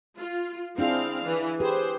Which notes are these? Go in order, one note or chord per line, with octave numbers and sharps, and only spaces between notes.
F4
C4 D4 E4 G#4 F5
E3
G4 G#4 B4 C5